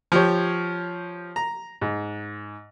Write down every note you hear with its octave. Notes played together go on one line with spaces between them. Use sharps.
F3 G4 C#5
A#5
G#2